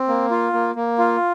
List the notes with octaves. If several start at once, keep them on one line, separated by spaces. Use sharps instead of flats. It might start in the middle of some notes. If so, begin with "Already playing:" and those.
Already playing: C4
A#3
F4
A#3
A#3
F4